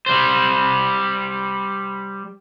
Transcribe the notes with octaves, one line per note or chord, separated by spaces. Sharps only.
G3 C5